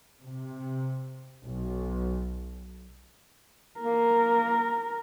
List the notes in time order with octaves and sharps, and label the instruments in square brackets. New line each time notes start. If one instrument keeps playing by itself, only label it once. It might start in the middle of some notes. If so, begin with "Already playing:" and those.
[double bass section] C3
B1
[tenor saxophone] A#3 [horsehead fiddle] A#4